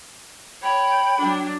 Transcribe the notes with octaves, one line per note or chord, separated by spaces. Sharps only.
C#5 G5 B5
F#3 D4